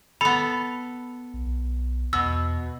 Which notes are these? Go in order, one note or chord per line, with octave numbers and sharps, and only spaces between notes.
B3 A4 B5
B1
E2 B2 E6